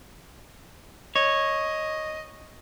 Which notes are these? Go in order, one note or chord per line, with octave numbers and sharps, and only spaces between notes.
C#5 D#5